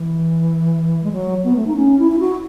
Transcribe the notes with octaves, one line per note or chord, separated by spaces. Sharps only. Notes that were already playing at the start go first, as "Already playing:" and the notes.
Already playing: E3
G#3
F#3
B3
A3
D#4
C#4
E4
E4
F#4